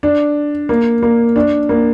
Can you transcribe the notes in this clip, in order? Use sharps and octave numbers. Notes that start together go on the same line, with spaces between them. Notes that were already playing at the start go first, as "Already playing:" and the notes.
D4
A#3
A#3
D4
A#3